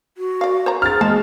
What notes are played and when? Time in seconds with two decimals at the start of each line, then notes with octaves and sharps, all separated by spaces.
0.18 F#4
0.41 D5 F5
0.66 C5 D5 A#5
0.82 G#4 F6 A6
1.01 G#3 A5